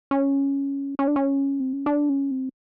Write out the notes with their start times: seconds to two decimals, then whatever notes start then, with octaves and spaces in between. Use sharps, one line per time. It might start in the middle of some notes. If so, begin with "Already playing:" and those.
0.11 C#4
0.99 C#4
1.07 D4
1.16 C#4
1.60 C4
1.73 C#4
1.86 D4
2.09 C#4
2.31 C4